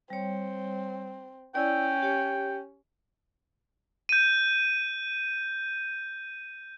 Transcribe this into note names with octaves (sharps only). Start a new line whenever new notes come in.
G3 C4 C#5
C#4 E4 D5 G5
G4 C#5
G6 D#7